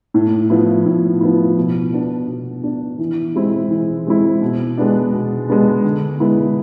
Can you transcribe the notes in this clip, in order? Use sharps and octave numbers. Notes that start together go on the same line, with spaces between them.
A2
F3 B3 E4
A2
F3 B3 E4
B2
B3 D4
B2
B3 D4
E3
G#3 C4 E4
E3
G#3 C4 E4
B2
G#3 B3 D4
B2
G#3 B3 D4
D3
G#3 B3 E4